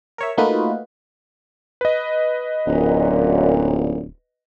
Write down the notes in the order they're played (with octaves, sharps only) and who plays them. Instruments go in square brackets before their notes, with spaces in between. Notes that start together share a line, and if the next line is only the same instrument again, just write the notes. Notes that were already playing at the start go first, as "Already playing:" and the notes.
[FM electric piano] A#4 C#5 E5
A3 A#3 D#4 F4 F#4 B4
[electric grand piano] B4 D#5
[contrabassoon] D1 [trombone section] F#2 A#2